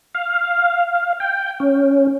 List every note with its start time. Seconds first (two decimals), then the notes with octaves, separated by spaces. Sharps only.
0.15 F5
1.20 G5
1.60 C#4